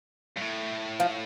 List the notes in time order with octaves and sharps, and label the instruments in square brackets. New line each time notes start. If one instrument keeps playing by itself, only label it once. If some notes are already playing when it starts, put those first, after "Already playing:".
[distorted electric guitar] G2
A2
[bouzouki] F3